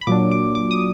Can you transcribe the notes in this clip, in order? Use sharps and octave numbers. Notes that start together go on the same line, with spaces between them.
B5
A#2 F#3 D4 D6
D6
D6
D#6